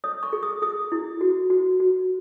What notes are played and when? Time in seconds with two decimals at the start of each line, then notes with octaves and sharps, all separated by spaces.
0.04 C#5 D#6
0.23 C#6
0.33 G#4
0.43 D#6
0.62 G#4 D#6
0.92 E4
1.21 F#4
1.50 F#4
1.80 F#4